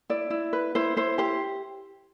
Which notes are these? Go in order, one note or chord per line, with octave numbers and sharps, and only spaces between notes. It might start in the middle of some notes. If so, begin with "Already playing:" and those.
E4 D5
E4
B4
E4 C5
E4 C5
G4 C5